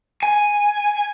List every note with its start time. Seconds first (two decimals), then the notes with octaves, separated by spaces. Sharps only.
0.23 G#5